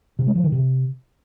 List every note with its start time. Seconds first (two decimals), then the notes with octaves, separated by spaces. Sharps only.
0.19 C3
0.27 G#3
0.35 F3
0.44 D#3
0.52 C3